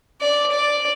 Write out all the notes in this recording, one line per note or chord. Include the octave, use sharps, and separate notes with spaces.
D5
D5